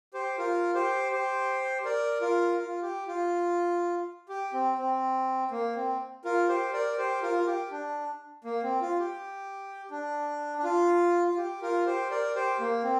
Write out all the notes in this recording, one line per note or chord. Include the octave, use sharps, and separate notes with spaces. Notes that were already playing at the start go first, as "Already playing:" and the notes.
G4 C5
F4 A#4
G4 C5
G4 C5
A#4 D5
F4 A#4
F4
G4
F4
G4
C4
C4
A#3
C4
F4 A#4
G4 C5
A#4 D5
G4 C5
F4 A#4
F4
G4
D4
A#3
C4
F4
G4
D4
D4
F4
F4
G4
F4 A#4
G4 C5
A#4 D5
G4 C5
A#3
C4